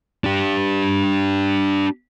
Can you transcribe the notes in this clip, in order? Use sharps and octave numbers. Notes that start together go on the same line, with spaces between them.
D4 G4